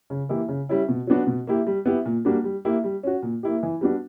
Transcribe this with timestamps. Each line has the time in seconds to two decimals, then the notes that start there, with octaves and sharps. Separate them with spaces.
0.10 C#3
0.29 E3 A#3 E4 G4
0.49 C#3
0.69 G3 C#4 E4
0.89 B2
1.07 F#3 B3 D4 F#4
1.27 B2
1.47 A#3 E4 G4
1.67 G3
1.86 B3 E4 G4
2.05 A#2
2.25 G3 A#3 D4 F#4
2.44 G3
2.65 A#3 E4 G4
2.84 G3
3.03 C#4 F#4
3.22 A#2
3.43 A#3 E4 G4
3.63 E3
3.81 G3 B3 D4 F#4